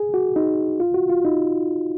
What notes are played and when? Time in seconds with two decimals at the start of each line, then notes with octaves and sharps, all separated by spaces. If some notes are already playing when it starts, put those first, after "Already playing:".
Already playing: G#4
0.14 F#4
0.36 D#4
0.80 F4
0.94 F#4
1.09 F4
1.25 D#4